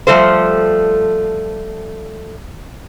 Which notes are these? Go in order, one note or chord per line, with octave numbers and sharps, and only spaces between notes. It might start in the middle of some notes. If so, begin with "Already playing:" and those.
F3 G3 A3 A4 C5